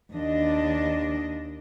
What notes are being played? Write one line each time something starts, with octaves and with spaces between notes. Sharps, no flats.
D#2 D4 D#5